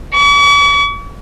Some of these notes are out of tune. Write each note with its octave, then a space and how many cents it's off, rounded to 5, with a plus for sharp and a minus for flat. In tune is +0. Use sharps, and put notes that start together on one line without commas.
C#6 +45